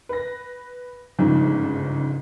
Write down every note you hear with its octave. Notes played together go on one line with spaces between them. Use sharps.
B4 A#6
G1 G#2 C#3 F3